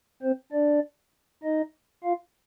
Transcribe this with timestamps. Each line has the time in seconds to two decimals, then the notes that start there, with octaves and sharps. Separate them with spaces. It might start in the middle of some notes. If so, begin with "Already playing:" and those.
0.22 C4 C5
0.52 D4 D5
1.43 D#4 D#5
2.04 F4 F5